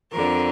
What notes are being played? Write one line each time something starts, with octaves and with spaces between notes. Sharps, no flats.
F2 D3 A#4